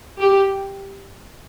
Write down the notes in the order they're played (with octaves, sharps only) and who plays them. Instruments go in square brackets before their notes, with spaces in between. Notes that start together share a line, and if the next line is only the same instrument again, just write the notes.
[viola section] G4